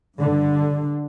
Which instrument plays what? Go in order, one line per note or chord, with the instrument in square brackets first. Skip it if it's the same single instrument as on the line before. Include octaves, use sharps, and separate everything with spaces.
[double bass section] G2 D3